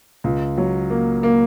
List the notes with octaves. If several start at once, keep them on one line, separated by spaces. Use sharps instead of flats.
C#2
F#3
A#3
A#3